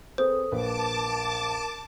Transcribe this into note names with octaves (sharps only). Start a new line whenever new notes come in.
C4 G#4 A4 B4 C5 D#6
A#1 A#4 B4 A5 D6